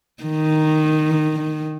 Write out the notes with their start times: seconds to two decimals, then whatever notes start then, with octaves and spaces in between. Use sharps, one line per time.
0.23 D#3